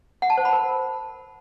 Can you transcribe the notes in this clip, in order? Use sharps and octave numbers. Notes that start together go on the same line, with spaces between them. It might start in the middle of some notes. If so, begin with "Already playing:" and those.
F#5
A5
C5
B5
A#4